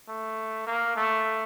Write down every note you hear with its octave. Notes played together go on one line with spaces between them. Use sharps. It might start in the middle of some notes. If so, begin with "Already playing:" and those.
A3
A#3
A3